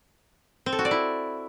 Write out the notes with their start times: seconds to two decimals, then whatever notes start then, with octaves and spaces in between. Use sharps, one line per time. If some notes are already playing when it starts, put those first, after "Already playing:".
0.66 C4
0.72 A4
0.79 F#4
0.85 D5
0.91 E4